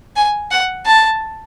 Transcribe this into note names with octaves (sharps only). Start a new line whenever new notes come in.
G#5
F#5
A5